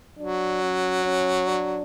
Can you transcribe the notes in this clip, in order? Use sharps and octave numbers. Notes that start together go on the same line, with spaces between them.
F#3 D4
C#4
C#4
D4